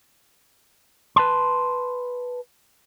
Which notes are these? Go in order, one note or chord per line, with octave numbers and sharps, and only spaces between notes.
B4 A5 C6